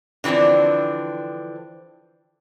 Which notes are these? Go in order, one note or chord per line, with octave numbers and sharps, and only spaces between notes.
D3 E3 F3 C4 D4